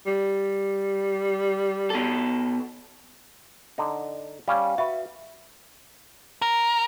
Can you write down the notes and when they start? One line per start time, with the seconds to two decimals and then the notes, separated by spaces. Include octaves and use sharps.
0.06 G3
1.90 B2 A4
3.78 D3 D#4
4.48 G3 C#4 F5
4.78 F#4 B4 E5
6.42 A#4